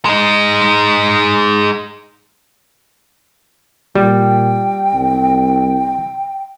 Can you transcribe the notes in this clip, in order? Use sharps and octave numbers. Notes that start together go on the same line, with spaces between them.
G#3 D#4
A#2 G3 G5
C2